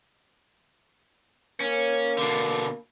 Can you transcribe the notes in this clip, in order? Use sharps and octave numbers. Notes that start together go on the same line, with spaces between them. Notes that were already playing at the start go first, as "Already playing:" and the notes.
A#3 C#4
B2 D3